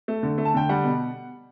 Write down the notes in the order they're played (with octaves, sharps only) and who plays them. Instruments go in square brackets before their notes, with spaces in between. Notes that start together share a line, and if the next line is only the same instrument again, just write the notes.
[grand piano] A3
D3
A3
A5
D3 G5
G3 F#5
B2